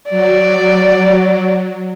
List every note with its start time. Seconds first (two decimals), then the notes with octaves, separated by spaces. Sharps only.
0.10 F#3 D5